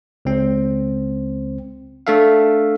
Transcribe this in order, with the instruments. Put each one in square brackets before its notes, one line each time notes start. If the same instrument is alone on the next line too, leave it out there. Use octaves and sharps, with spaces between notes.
[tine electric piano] C#2 C4
A3 D4 A4 E5 F5